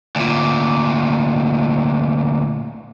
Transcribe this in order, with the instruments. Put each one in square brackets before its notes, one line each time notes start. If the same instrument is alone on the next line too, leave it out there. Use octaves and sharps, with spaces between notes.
[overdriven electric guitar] D2 A#2